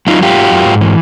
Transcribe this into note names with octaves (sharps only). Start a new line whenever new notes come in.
F#3 D#4 F4
G#2 F4 G4
F#3
F#2
G#2
E3